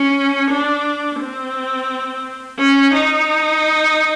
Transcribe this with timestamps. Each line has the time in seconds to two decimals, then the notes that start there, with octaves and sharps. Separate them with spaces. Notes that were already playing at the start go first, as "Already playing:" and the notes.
Already playing: C#4
0.50 D4
1.20 C4
2.58 C#4
2.93 D#4